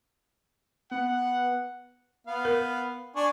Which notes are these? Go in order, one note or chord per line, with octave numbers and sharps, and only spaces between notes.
B3 F#5
B3 F5
A#4
D4 G#5 C#6